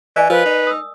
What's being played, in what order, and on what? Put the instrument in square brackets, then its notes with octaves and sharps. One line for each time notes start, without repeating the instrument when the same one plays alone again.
[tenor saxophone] E3 [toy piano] D5 D#5 G#5
[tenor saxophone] F3 [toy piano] A#4 [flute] B4
[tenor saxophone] D#4
[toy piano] D#6 E6